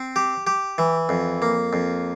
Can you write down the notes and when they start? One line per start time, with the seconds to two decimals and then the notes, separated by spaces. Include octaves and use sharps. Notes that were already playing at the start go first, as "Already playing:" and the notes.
Already playing: C4
0.16 G4
0.47 G4
0.78 E3
1.09 F2
1.42 A#3
1.73 F2